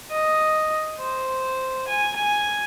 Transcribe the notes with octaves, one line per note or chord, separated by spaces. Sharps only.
D#5
C5
G#5
G#5